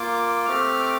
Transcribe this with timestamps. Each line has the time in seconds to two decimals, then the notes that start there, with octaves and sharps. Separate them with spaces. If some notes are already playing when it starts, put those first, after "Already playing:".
Already playing: A#3 F4 D6
0.46 A3 C4 G4 F6
0.81 D6